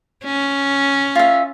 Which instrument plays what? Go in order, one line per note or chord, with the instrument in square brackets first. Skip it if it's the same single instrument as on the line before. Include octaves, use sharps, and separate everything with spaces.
[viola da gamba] C#4
[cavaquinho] F4 E5